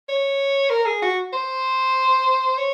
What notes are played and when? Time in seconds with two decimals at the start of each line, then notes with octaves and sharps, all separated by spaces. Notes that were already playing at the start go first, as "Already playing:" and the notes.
0.08 C#5
0.70 A#4
0.86 G#4
1.02 F#4
1.33 C5
2.58 C#5